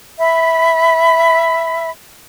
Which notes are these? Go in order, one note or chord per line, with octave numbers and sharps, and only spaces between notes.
E5 B5